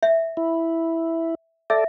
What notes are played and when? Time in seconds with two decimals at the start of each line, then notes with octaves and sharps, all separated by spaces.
0.03 E5
0.37 E4
1.70 A4 D5 E5